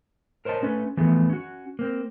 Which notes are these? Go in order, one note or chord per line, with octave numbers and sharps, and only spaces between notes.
A#4 C5 C#5 D#5 A5
A3 C#4 B4
E3 F3 A3 B3 G#4
C#4 F#4
A#3 C4